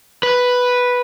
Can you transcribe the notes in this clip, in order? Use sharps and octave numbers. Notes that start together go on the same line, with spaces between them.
B4